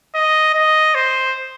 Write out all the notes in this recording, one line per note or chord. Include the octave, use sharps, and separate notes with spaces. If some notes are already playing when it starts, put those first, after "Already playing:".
D#5
D#5
C5